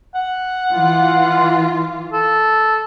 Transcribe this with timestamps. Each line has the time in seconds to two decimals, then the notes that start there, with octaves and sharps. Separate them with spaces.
0.15 F#5
0.72 E3 F4
2.13 A4